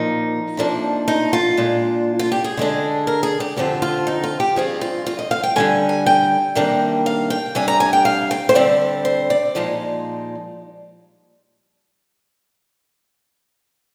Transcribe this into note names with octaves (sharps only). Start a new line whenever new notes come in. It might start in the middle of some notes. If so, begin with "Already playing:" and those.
Already playing: A#2 F3 A#3 D#4
C3 F3 A#3 D4
D#4
F4
A#2 G#3 D4
F4
G4
G#4
D3 G#3 D4
A#4
G#4
G4
F2 D3 F3 C4 G4
F4
D#4
F4
G4
G2 F3 C4 G#4
F4
F4
D#5
F5
G5
D3 G3 D4 G#5
G#5
G5
C3 D#3 G3 A#3 D4
F5
G5
C3 G3 D4 G#5
A#5
G#5
G5
F5
G5
C5
D3 G3 C4 D5
C5
D5
A#2 F3 G#3 D#4